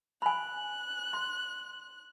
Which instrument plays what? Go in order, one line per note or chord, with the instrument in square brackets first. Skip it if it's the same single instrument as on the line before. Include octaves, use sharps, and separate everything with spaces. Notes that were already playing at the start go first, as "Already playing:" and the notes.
[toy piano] G#5 B5 [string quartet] F#6
[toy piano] C6